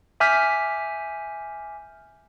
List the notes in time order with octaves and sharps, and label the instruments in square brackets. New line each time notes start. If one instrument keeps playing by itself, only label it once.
[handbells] E5 G#5 D6 F6 G6 B6